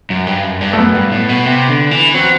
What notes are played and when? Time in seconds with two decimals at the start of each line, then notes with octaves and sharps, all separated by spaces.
0.10 F#2
0.27 G2
0.44 F#2
0.61 G2
0.73 A3
0.78 F#2 B3
0.95 G2
1.12 A2
1.29 B2
1.46 C3
1.69 D3
1.91 E3
2.14 F#3 C4